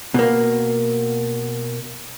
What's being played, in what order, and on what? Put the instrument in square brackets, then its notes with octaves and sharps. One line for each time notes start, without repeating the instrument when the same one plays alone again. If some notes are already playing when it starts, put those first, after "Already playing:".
[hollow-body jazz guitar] B2 A#3